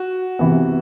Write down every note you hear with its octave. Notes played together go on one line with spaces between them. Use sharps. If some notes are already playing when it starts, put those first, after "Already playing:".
Already playing: F#4
C3 E3 B3